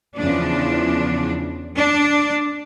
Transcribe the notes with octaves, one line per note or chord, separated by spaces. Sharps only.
E2 C#3 F3 D4
D4